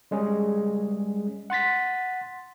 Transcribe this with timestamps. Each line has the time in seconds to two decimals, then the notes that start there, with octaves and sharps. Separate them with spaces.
0.11 G3 G#3 C#4 G#4
1.50 F#5 C6 A6 B6